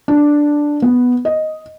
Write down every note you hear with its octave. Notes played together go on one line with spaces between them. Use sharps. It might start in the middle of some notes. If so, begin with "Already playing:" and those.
D4
B3
D#5